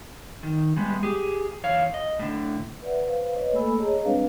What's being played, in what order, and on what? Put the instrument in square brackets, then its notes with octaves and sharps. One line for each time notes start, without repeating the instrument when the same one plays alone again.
[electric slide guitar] D#3
G3 G#3 B3
G4 G#4
E2 C#5 F5
D#5
A2 D3
[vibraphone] B4 D5 E5 F#5
B4 C5 F5
B4 C#5 D#5
A3 A#3 A4 G#5 B5 E6
G#4 C#5 D#5 A5 A#5
G3 G#3 C4 D4 B4 F5